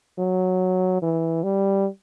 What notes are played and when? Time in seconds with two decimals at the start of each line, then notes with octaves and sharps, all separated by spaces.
0.19 F#3
1.02 E3
1.44 G3